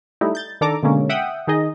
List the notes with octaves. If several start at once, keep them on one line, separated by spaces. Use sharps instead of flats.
G3 A3 D#4 E4
G6 A6
D#3 D4 A4 A#5 D6
B2 D3 G#3 A#3 C#4
E5 F#5 G5 D#6
D#3 D#4 G#4 D#5